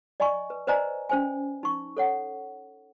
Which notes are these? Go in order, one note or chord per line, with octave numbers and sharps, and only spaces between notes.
D5 D#5 G#5 B5 C#6
B4
B4 C5 D5 D#5 G#5 A#5
C#4 C5 G#5
D#4 C#6
A4 C#5 F#5